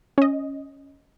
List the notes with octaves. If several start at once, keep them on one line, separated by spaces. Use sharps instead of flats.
C#4 D#5